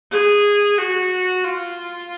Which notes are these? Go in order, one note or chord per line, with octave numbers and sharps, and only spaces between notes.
G#4
F#4
F4